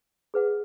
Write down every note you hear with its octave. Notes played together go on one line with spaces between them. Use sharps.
G#4 B4 F#5